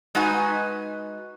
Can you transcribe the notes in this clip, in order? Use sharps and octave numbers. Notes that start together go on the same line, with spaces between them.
G#3 D#4 F#4 B4 G#5